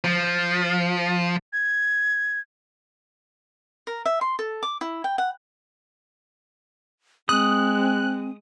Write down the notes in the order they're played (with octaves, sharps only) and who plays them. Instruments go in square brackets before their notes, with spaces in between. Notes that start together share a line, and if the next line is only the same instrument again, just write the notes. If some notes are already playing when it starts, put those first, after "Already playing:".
[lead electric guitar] F3
[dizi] G#6
[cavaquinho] A#4
E5
C6
A4
D6
E4
G5
F#5
[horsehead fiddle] G#3 [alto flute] C4 [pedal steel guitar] D#6 [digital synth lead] F#6